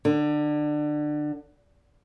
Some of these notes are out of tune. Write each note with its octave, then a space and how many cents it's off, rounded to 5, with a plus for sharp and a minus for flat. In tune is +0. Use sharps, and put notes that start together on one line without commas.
D3 +25